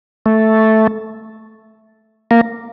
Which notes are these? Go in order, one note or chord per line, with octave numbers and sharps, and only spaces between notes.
A3
A#3